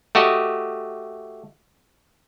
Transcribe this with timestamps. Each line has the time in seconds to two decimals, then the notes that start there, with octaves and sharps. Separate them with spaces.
0.15 A3 F#4 G4 D#5